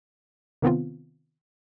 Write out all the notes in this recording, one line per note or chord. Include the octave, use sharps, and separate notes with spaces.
C3 D#3 B3 C4 F4